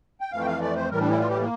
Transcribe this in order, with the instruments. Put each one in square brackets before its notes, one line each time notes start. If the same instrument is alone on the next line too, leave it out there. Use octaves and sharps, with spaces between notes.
[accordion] G5
F2 E3 A3 F5
G5
F5
D5
C5
A2 E3 G3 A#4
D4
E4
F4
G4
A#3